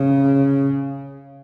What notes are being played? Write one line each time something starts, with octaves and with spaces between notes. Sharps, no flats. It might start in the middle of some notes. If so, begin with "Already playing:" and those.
Already playing: C#3